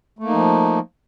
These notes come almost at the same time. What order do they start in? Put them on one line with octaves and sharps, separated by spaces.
A3 A#3 D#4 F3